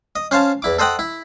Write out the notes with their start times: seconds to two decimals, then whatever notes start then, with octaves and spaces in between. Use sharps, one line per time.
0.16 D#5
0.31 C#4 C5 F5 A5
0.62 E2 E4 D6
0.79 A4 C5 D#5 F#5 G5
0.99 E4